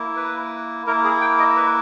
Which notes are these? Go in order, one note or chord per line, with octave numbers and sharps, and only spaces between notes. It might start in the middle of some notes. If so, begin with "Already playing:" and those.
Already playing: A#3 E4
B4
A#3 E4 A#4
G#4
G5
D#5
B4